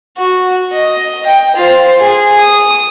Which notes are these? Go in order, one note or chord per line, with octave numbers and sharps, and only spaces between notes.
F#4
D#5
G5
F4 C5
G#4
D#6